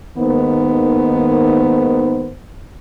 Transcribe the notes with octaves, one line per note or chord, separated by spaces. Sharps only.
D#2 G#2 D#3 A#3 B3 C5